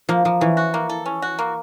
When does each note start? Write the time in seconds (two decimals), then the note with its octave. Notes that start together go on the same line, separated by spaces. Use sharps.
0.09 F3 A#3
0.25 F3 A#3
0.41 E3 C#4
0.57 F#4
0.74 A#3
0.89 A4
1.06 C#4
1.22 F#4
1.39 A#3